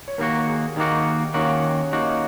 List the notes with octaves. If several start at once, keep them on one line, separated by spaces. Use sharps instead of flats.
C#5
D#2 D#3 A#3 F#4 A#4
G#4
D#2 D#3 A#3 D#4 F#4
D#2 D#3 A#3 C#4 F#4
D#2 D#3 A#3 D#4 F#4